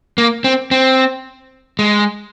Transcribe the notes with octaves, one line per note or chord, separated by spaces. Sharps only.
A#3
C4
C4
G#3